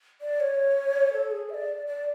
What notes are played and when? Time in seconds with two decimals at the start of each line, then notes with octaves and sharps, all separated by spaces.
0.21 D5
0.40 C#5
1.13 A4
1.31 G#4
1.49 E5
1.54 D5
1.87 D5